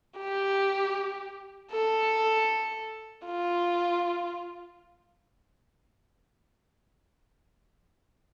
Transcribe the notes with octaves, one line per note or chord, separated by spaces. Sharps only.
G4
A4
F4